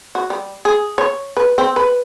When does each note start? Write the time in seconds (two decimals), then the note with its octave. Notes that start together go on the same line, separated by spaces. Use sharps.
0.15 F#4
0.30 G3
0.65 G#4
0.98 C#5
1.37 B4
1.58 C4
1.76 B4